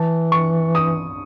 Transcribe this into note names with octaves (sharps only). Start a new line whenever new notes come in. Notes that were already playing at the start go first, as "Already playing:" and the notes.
Already playing: E3 A5
C#6
D#6